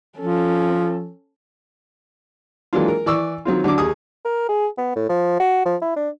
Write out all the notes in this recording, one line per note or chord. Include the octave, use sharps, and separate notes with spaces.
F3 C#4 A4
E3 F#3 G#3 A#3 D4 F4
A#4
E3 D5 C#6 E6
D#3 F#3 C4 F4
D3 F#3 D4 D6
D#2 G#4 D#6
A#4
G#4
B3
A2
F3
F#4
F3
E4
D4